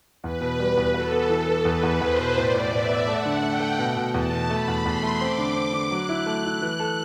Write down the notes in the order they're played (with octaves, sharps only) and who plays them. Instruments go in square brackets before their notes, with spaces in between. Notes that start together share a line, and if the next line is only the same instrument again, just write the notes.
[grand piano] E2 [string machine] B4
[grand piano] B2
G3
E2
[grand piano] F#4 [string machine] A4
[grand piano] B3
E3
B3
[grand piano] E2 [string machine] B4
[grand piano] E2
[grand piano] E2 [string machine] C5
[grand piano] B2
[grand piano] A2 [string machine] D5
[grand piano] A2
[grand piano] A2 [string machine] E5
[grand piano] B3
[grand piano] A3 [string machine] F#5
[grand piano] D3
[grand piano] A3 [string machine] G5
[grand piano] A3
B2
B2
[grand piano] E2 [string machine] A5
[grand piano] B2
[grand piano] A3 [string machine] B5
[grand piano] E2
[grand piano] E2 [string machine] C6
[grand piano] A3
[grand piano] C4 [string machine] D6
[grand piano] D3
C4
D3
[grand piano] F#3 [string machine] F#6
[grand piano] E4
[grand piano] A3 [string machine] F#6
[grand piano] E4
E3
A4